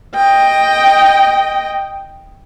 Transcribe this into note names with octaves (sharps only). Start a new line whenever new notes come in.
D#5 G5